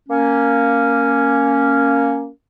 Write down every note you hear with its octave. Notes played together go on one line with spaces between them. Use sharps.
A#3 C#4